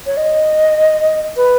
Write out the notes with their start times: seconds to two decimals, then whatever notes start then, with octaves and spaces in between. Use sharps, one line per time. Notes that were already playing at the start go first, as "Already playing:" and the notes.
0.07 C#5
0.17 D#5
1.37 B4